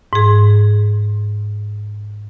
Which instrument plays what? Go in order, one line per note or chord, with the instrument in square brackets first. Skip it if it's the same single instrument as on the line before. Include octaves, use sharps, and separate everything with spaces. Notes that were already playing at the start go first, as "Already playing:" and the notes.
[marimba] G#2 G#4